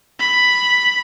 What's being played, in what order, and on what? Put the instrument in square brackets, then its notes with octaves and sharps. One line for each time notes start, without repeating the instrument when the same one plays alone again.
[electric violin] B5